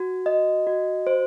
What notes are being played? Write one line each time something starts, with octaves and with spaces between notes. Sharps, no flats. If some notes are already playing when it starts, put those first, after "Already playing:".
Already playing: F#4
D#5
F#4
C5